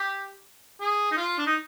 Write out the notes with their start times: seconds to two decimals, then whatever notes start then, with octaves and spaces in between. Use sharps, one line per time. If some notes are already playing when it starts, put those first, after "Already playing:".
Already playing: G4
0.80 G#4
1.11 D#4
1.17 F4
1.38 D4
1.46 D#4